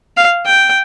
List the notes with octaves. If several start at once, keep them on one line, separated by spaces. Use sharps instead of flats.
F5
G5